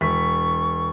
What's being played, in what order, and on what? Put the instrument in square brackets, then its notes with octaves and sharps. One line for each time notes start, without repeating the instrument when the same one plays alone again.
[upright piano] E1 B6 [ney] C#6